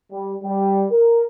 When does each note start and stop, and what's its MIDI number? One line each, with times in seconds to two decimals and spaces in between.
0.12 0.34 55
0.43 0.86 55
0.91 1.23 70